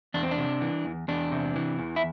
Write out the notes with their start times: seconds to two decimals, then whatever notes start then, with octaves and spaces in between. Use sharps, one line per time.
0.14 E2 D4
0.23 C4
0.31 D4
0.38 C3
0.61 E3
0.85 E2
1.08 E2 D4
1.32 C3
1.56 E3
1.79 E2
1.96 E4